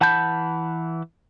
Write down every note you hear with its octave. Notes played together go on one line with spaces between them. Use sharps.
E3 F#5 A5 B5 G6